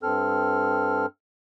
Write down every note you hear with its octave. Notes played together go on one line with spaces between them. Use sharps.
G2 C4 A4 F6